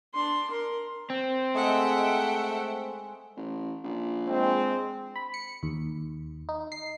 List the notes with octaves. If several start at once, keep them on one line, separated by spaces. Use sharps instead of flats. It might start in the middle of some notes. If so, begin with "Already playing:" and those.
D4 C6
A#4 C6
C4
G#3 A3 E5 F#5 G5
A1
A#1
G#3 C4
B5
C#7
D#2
D#4
C7